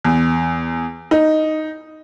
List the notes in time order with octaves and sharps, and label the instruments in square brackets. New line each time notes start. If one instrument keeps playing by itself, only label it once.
[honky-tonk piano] E2
D#4